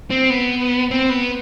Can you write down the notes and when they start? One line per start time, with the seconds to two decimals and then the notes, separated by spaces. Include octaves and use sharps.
0.10 C4
0.30 B3
0.91 C4
1.10 B3